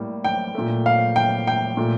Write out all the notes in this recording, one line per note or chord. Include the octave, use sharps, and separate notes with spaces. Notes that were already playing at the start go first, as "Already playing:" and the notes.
Already playing: A2 G3 A#3
G5
A#2 A3
F5
G5
G5
A#2 A3